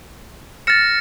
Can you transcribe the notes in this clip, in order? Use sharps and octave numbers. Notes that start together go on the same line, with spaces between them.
F6 A6 A#6 C#7 E7